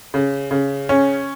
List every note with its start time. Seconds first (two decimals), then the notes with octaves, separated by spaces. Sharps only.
0.14 C#3
0.51 C#3
0.89 C#4